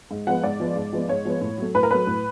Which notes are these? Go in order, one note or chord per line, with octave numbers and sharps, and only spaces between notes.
G#2
F3 G#3 B3 F#5
G#2 D5
F3 G#3 B3
G#2
F3 G#3 B3
G#2 C#5
F3 G#3 B3
A2
F#3 A3
A2 B4
A#4
F#3 A3 B4
A2